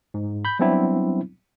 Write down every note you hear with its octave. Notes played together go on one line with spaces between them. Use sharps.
G#2
B5 G6
F#3 G3 B3 C4 D4 E4